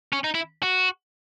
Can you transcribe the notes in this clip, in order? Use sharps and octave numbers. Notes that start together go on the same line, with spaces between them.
C#4
D#4
E4
F#4